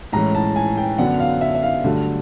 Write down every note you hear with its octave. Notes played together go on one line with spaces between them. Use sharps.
A2 E3 G#3 C#4 A#5
A5
G#5
G5
F#2 D3 F#3 B3 D4 F#5
F5
E5
E5
F5
G2 D3 F#3 A3